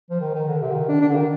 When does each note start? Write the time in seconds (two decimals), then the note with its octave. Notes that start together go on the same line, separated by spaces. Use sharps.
0.10 F3
0.21 D#3
0.34 D#3
0.48 D3
0.61 C3
0.71 D3
0.74 D#3
0.89 D4
1.01 D4
1.09 D3
1.15 D#3